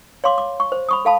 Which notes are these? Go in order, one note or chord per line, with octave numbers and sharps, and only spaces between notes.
C#5 F5 C6 D6
D6
C#6
C5
B5 C#6 D#6
A4 F5 A5 B5